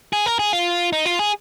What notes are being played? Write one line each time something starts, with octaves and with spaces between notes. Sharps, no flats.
G#4
A#4
G#4
F4
D#4
F4
G#4